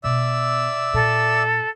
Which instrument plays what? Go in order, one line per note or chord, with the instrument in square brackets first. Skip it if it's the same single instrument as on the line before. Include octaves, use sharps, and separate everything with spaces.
[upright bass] B2 [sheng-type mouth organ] D5 E5 E6
[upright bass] A#2 [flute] A4